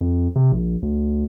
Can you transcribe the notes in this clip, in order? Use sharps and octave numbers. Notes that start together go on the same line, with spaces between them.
F2
C3
A#1
D2